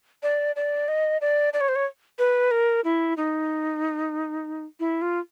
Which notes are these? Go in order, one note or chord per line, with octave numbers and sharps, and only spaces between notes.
D5
D5
D#5
D5
D5
C#5
C5
C#5
B4
A#4
E4
D#4
E4
F4